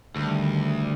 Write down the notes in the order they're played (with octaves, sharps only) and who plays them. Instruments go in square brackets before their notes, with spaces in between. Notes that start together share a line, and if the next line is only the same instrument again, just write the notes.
[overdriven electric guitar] D2 [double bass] D#3 G3